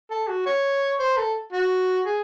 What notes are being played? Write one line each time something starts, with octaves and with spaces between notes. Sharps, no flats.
A4
F#4
C#5
C5
A4
F#4
G#4